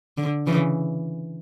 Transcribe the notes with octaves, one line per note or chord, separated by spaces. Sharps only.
D3
C#3 E3